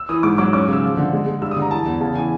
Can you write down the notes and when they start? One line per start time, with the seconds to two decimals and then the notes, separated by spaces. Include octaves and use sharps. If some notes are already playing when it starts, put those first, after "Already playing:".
Already playing: E6
0.09 E3 D#6
0.23 G#2 D6
0.38 F#3 D6
0.53 C#4 D6
0.68 C#3 E6
0.83 F3
0.97 D3
1.13 G#3
1.26 G#3
1.42 G2 E6
1.51 D#6
1.56 D3
1.62 A#5
1.71 E3 A5
1.86 E2
2.01 C#3 A5
2.15 E3 G#5